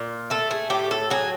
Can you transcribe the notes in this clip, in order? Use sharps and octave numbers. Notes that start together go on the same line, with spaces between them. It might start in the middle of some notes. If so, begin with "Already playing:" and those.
Already playing: A#2
A3 A4
G#4
A2 G4
A4
F#3 G#4